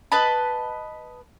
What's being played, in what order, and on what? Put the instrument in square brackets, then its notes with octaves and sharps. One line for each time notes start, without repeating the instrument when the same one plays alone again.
[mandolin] B4 D#5 A5 B5